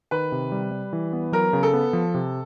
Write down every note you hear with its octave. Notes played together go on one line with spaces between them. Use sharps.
D#3 B4
C3
G3
G3
E3
B3
F#3 A#4
C#3
A4
B3
F3
C3